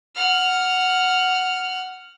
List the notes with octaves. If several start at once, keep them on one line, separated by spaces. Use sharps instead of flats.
F#5 F6